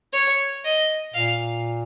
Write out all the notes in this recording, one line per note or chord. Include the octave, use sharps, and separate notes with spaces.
C#5
D#5
A#2 F5